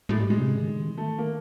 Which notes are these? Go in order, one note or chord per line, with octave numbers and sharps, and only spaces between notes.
A2 G#3
G#2 G3
A2 G#3
C3
C#3
D#3
D3
D#3
E3
D#3 A3
A#3